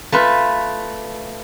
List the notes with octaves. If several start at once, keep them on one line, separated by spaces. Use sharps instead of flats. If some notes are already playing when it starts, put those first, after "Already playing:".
A3 F4 B4